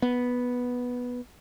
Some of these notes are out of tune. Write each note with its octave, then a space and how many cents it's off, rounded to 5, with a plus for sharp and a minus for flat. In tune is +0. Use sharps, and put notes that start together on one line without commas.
B3 -5